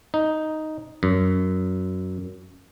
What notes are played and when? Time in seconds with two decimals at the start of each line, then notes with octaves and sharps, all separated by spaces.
0.14 D#4
1.03 F#2